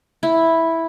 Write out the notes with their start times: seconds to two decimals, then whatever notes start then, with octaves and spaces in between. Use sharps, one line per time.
0.23 E4